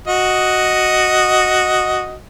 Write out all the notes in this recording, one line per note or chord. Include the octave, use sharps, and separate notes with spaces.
F#4 D#5